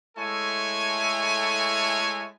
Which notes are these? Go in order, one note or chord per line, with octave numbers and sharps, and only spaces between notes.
G#3 A3 E4 A4 C#5 G#5